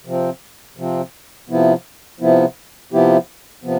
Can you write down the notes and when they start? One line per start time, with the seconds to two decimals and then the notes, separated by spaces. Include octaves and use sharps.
0.05 C3 F3 C4
0.77 C3 F3 C4
1.49 C3 F3 B3 E4
2.20 C3 F3 B3 E4
2.92 C3 F3 B3 E4 G4
3.63 C3 F3 B3